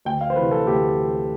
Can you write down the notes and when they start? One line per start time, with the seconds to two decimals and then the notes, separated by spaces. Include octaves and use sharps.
0.05 D2 G5
0.21 F5
0.30 C5
0.36 C3 E3 B4
0.51 A4
0.67 D2 G4